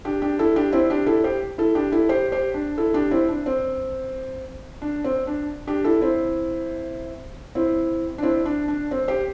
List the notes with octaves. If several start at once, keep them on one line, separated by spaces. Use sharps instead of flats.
D4 G4
D4 G4
E4 A4
D4 G4
C4 E4
D4 G4
E4 A4
G4 C5
E4 A4
D4 G4
E4 A4
G4 C5
G4 C5
D4
E4 A4
D4 G4
C4 E4
D4
C4
D4
C4
D4
D4 G4
E4 A4
C4 E4
C4 E4
D4
C4 E4
D4
D4
C4
G4 C5